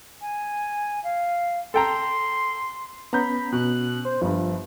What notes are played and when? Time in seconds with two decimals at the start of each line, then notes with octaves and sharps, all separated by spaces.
0.22 G#5
1.04 F5
1.74 A4 G5 A#5 C6
3.13 B3 C#4 A#5 B5 G6
3.52 B2 F#6
4.05 C5
4.22 G1 G2 F3